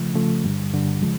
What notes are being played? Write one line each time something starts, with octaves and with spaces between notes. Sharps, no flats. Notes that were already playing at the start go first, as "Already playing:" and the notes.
Already playing: C#3 F3 A3
C#3 F3 A3
G2 D3 G3
G2 D3 G3
C#3 F3 G#3